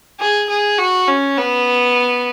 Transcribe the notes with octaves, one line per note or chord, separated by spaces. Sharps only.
G#4
G#4
F#4
C#4
B3